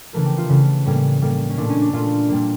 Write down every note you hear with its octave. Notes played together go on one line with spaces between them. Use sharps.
C#3 E3 A3 A#4
G4
F4
C#3 E3 A3
A2 G3 A#3 C#4
A2 G3 A#3
C#4
A#2 A3 D4
C#4
D4
A#2 A3 F4
A#2 G3 A#3